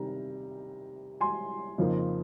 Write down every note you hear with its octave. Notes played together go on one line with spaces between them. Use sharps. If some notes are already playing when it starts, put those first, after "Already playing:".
Already playing: C3 D#3 G3 A#5
G#5 C6
F2 C#3 F3 A#3 D#4